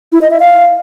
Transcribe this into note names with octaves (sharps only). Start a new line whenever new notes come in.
E4
D#5
E5
F5